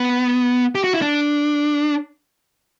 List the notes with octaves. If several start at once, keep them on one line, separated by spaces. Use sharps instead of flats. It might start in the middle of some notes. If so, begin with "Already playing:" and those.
Already playing: B3
G4
F#4
E4
D4